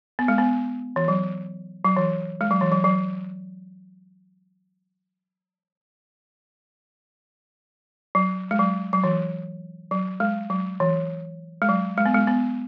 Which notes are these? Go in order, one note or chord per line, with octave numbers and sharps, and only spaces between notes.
B3
G#3
B3
E3
F#3
F#3
E3
G#3
F#3
E3
F#3
F#3
F#3
G#3
F#3
F#3
E3
F#3
G#3
F#3
E3
G#3
F#3
G#3
B3
G#3
B3